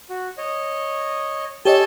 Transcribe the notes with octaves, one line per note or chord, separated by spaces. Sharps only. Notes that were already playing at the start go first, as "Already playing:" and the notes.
F#4
C#5 D#5
G4 A4 C#5 D#5 G#5 A5